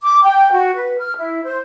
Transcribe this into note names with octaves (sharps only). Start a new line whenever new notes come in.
D6
G5
F#4
B4
F6
E4
C5